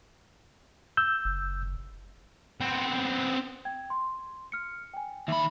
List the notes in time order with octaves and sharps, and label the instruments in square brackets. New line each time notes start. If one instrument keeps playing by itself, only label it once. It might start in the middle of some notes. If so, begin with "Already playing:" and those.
[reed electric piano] E6 G6
[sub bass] F#1
[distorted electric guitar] B3 C4
[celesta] G5 G#6
C6
F6 C#7
G5 G#5
[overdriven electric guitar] D#2 B5 [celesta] E5